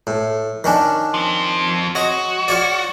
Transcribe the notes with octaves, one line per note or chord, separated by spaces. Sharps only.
A2
D#3 C#4 D4
F3 C4
F#4 C#5 D#5
F4 C#5 D5